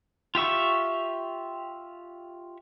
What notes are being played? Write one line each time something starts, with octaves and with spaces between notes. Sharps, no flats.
F4 G4 E5 C#6